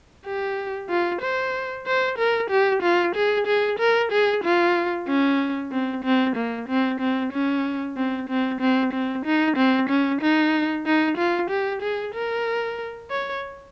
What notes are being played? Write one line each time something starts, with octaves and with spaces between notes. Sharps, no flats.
G4
F4
C5
C5
A#4
G4
F4
G#4
G#4
A#4
G#4
F4
C#4
C4
C4
A#3
C4
C4
C#4
C4
C4
C4
C4
D#4
C4
C#4
D#4
D#4
F4
G4
G#4
A#4
C#5